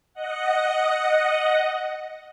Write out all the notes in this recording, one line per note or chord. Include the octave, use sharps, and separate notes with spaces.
D#5 F#5